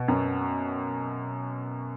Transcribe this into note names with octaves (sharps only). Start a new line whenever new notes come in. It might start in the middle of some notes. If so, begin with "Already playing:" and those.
Already playing: B2
F#2